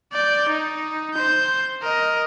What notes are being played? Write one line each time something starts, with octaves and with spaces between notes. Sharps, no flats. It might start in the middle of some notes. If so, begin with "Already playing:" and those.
D5 G6
D#4
C5 G6
A#4 D#5